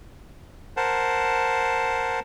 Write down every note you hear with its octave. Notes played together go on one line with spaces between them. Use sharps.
A#4 C5 F#5 A5